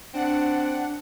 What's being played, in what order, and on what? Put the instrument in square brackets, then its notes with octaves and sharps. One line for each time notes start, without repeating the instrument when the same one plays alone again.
[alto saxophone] C4 [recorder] D4 [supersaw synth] F#5